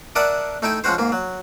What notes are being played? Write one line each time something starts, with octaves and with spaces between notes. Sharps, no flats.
D4 A#4 D5 E5 F#5 D#6
A3 D#4 E4 G5 G#5
F3 G#3 C#4 F#4 C5
G#2 A#3
F#3